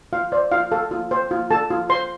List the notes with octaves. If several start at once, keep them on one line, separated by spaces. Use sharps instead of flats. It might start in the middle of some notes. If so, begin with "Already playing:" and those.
F4 F5
C5 D5
F4 F5
A4 F5
F4
C5
F4
A4 A5
F4
C5 C6